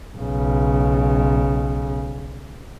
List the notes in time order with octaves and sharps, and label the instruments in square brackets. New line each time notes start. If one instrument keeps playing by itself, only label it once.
[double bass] B1 C#3